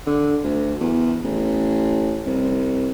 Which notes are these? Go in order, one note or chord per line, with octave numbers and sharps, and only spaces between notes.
D3
D2
E2
A1
C2